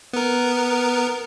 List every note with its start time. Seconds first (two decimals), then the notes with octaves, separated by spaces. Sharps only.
0.13 B3 A#4